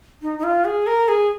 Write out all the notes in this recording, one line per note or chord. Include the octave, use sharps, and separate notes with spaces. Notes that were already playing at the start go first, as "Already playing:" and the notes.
D#4
D#4
F4
G#4
A#4
G#4